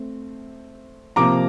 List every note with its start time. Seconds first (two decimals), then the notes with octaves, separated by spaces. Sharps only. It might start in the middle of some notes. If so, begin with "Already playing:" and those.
Already playing: A3 C4
1.16 C3 F3 A#3 A#5 D6